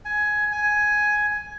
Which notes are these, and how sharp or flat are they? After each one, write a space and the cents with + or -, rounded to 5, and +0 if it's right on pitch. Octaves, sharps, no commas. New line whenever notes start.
G#5 +15
G#5 +10